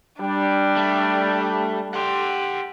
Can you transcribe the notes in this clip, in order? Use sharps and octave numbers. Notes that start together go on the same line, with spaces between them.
G3 D4
A3
G4 F#5 C6